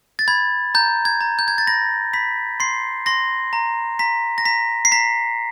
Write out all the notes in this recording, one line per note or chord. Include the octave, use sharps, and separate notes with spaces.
A6
B5 G#6
A#5 G6
G#6
A#5
G6
G#6
A6
B5 A#6
B5 B6
C6 C7
C6 A#6
A#5
A#5 B6
A#6
A#5 B6
C7
A#5 B6